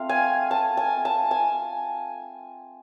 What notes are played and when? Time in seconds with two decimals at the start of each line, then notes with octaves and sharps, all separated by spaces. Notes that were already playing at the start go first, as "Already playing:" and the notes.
Already playing: A3 C4 F4 F5
0.09 G#5
0.51 A5
0.77 G#5
1.05 A5
1.31 G#5